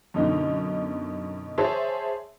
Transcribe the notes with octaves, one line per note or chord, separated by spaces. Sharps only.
F#2 B2 D3 D#4
G#4 C5 C#5 E5 A5